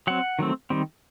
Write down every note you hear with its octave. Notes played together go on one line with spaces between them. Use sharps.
F#3 C4 F#5
D#3 F#3 A3 C4
D#3 G3 C4